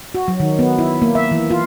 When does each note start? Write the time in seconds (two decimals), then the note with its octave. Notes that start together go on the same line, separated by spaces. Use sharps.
0.14 F#4
0.28 F#3
0.40 D#3
0.59 B3
0.78 E4
1.02 A#3
1.15 E5
1.31 E3
1.50 F4